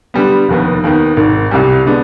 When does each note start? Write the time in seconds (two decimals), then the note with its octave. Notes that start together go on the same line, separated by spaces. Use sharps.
0.14 D3 G3 B3
0.49 F1 D#2 D#3 B3
0.83 D#2 D#3 B3
1.17 G#1 G#2 D#3
1.51 C2 C3 G3
1.85 D3 G#3 B3 D4